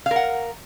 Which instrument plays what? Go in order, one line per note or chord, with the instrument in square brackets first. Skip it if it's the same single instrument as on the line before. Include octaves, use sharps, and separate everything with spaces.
[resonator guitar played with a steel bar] F5
A#4
F#5